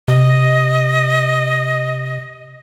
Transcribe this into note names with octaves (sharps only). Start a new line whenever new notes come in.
C3 D#5